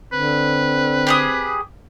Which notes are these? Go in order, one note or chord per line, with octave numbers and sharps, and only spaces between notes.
D3 C4 B4
G4 G#4 D#6